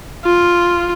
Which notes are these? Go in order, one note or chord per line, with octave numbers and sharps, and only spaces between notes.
F4